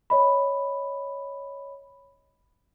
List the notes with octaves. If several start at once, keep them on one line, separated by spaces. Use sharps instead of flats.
C#5 D#5 B5